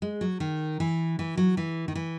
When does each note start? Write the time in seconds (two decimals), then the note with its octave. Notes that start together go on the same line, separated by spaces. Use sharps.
0.02 G#3
0.21 F#3
0.40 D#3
0.80 E3
1.19 E3
1.37 F#3
1.57 E3
1.88 D#3
1.95 E3